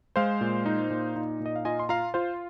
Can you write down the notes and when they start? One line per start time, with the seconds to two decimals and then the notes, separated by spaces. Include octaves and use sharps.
0.16 G#3 C5 F5
0.41 A#2
0.66 D#4
0.90 A#2
1.16 D#4
1.40 A#2
1.46 D#5
1.56 F5
1.65 F4 D#5 G#5
1.79 C6
1.89 F4 F5 A#5
2.14 F4 C5 F5